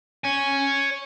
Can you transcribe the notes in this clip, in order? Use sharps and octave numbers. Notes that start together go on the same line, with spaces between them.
C#5 G#5